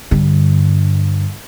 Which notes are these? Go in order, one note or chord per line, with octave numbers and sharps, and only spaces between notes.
G2 D3